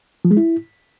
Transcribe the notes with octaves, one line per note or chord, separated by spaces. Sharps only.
F3
G#3
E4